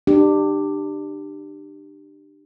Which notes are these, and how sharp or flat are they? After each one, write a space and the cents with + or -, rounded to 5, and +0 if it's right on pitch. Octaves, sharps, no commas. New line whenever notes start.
D4 +35 G4 +0